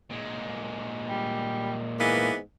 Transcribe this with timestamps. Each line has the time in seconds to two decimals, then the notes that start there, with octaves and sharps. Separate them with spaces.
0.11 A#2 G#3
1.09 G3
1.99 G#2 E3 A#3 B3